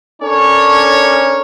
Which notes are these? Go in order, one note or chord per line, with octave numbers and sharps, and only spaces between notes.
C#4 D4 A4 A#4 C#5